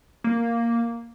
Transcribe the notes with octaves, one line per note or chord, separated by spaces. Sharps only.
A#3